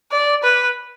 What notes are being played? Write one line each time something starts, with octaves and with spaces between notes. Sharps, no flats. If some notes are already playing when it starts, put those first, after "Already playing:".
D5
B4